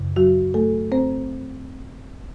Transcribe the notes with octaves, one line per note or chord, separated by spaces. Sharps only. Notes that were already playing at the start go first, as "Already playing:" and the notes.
Already playing: F#2 C#3
F#3 F#4
A3 A4
C4 C5